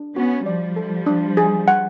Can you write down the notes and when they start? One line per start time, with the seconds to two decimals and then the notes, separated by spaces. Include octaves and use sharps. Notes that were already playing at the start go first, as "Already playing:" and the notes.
Already playing: D4
0.16 B3 C#4 F#4
0.46 F3 G3 D5
0.76 A4
1.06 D4
1.37 G#4
1.68 F#5